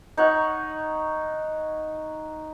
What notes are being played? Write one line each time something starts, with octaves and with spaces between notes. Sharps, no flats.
D#4 C#5 F#5